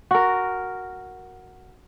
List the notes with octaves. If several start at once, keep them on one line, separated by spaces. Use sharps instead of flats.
F#4 A#4